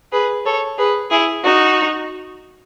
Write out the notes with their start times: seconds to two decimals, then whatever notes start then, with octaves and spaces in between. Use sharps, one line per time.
0.12 G#4 B4
0.45 A4 C#5
0.77 G#4 B4
1.10 E4 G#4
1.44 D#4 F#4